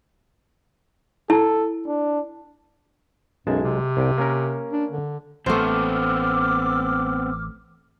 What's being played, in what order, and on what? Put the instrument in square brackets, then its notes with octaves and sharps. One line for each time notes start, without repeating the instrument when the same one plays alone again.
[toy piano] E4 A5 [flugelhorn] A4
[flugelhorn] D4
[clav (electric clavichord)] B1 G#3 A5 [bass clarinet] F#2
[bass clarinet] C3
[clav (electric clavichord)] C2 G5
A#3 C#4 A#4
[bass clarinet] D4
D3
[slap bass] A1 [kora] A3 C5 [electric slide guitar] B3 C4 [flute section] D6 E6 F6